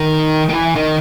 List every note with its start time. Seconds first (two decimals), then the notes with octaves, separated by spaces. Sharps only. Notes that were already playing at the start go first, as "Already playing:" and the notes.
Already playing: D#3
0.49 D#3
0.53 E3
0.75 D#3